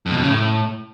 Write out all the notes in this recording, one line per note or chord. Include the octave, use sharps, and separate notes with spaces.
F2
B2
F2
C#3
A2